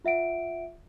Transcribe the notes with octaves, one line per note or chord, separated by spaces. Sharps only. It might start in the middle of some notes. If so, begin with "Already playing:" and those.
F4 E5 F#5 D7